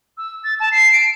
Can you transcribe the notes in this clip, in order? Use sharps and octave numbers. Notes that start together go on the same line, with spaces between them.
E6
A6
A5
C7
D7